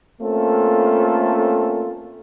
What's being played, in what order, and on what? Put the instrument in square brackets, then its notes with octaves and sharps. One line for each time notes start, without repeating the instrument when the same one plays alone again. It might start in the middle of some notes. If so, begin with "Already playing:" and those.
[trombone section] A3 A#3 C4 C#4 F4 A4